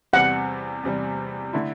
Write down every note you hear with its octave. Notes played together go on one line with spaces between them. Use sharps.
E2 C3 G3 F#5
E2 C3 G3
D3 A3 E4